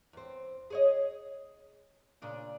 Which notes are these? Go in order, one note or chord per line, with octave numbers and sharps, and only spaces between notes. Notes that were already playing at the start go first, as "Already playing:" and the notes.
E2 C4
G#4 C#5 D#5
A#2 C#3 D4